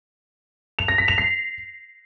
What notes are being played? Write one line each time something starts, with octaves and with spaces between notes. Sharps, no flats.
F7
A#6
B6
F7
C7